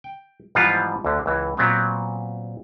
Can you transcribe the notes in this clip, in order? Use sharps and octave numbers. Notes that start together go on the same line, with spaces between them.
G5
G#2 E3 F3 G3 B3 F4
D2 D3
C#2 E3
A#2 F#3 B3 C4